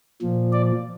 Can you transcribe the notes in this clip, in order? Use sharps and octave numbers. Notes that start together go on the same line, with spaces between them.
A#2 F3
D5